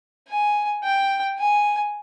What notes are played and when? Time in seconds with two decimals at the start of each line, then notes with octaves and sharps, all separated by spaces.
0.29 G#5
0.83 G5
1.39 G#5